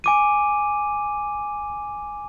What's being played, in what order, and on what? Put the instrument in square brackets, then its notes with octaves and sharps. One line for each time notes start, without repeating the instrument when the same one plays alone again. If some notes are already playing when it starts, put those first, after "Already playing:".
[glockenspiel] G#5 D6 D#7